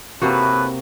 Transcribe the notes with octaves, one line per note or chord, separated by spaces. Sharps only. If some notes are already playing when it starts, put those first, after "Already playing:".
A2 C3 A#3 F#4 B4